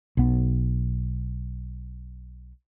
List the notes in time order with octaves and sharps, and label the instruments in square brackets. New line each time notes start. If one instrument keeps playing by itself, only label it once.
[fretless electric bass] B1 B3